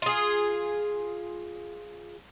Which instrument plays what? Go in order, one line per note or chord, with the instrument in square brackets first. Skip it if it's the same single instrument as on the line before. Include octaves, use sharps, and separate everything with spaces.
[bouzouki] F4 G#4